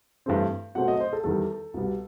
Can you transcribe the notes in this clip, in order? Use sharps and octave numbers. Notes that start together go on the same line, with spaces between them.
G2 E3 A3 C4
B2 F#3 A3 C4 F#5
D#5
C5
A4
E2 D#3 G3 A4
C2 B2 G3 B3